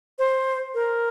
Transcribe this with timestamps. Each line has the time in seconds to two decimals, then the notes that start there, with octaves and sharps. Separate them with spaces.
0.19 C5
0.75 A#4